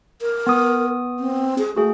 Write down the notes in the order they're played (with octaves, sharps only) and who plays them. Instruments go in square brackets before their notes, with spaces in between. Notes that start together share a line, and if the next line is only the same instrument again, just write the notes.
[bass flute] A#4
[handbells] B3 D#6
[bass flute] C4
G#4
[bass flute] A3 [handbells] F#4 G#4